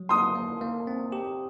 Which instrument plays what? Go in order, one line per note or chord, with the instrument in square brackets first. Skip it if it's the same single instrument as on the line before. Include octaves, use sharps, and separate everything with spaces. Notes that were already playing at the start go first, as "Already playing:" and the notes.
Already playing: [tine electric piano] F#3
[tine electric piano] A#3 [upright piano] C6 D#6
[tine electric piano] A#3
A#3
C4
G4